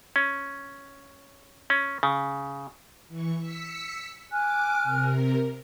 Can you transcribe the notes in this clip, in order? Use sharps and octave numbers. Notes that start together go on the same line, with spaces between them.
C#4
C#4
C#3
E3 C#6
E6 B6 C#7
G#5 D6 F6 F#6
C3 A#4